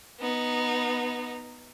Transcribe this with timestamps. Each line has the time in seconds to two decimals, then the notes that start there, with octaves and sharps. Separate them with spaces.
0.20 B3 D#4